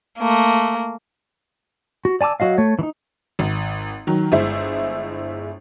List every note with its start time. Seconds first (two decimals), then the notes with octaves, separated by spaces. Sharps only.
0.18 A3 A#3
2.05 F#4
2.21 D5 G#5 A5 D6 E6
2.40 F#3 F#4 D#5 F5
2.58 A3 C#5
2.79 E3 D#4
3.39 G#1
4.07 D#3 F#3
4.32 G1 G#3 E4 C5 E5